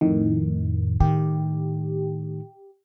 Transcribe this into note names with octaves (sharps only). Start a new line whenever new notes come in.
F2 A2 D#3
A2 D#3 G4